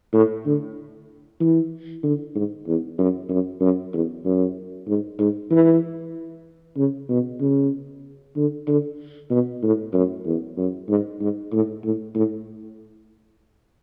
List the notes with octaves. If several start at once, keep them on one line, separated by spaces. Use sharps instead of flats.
A2
D3
E3
D3
G#2
E2
F#2
F#2
F#2
E2
F#2
G#2
G#2
E3
C#3
B2
C#3
D3
D3
B2
A2
F#2
E2
F#2
G#2
G#2
A2
A2
A2